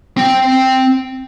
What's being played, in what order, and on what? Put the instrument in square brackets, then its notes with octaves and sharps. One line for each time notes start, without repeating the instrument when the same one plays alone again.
[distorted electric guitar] C4 G5